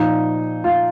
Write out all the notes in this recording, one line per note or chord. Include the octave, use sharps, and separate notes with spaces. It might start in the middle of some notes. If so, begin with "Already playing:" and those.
Already playing: A#2 F3 D#4
F4